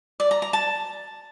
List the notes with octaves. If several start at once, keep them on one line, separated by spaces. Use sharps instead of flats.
D5
A#5
A#5
A5